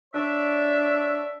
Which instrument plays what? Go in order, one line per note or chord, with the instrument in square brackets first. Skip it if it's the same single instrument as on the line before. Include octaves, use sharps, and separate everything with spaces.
[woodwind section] D4 C#5 E5